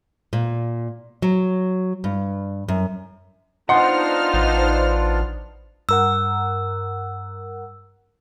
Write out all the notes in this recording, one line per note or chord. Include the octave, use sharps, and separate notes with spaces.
A#2
F#3
G2
F#2
B3 D4 D#4 F4 C5 F#5 C6 F6
A1
G2 A#4 F#5 E6